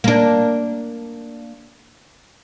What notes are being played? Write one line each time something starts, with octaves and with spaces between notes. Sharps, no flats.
A#3 D4